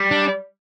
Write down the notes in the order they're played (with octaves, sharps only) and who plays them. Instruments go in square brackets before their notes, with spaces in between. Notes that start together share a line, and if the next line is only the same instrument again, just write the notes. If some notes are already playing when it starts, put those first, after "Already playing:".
Already playing: [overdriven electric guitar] G3
[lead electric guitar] D4